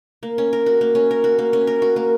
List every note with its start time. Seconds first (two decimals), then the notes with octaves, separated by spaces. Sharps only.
0.23 A#3
0.38 C#4
0.53 A#4
0.66 F#4
0.81 A#3
0.95 C#4
1.11 A#4
1.24 F#4
1.39 A#3
1.53 C#4
1.67 A#4
1.82 F#4
1.96 A#3